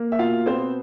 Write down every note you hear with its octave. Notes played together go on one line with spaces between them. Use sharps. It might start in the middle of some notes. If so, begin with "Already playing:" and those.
Already playing: A#3
E5
B2 F4 F5
B3 C4 C5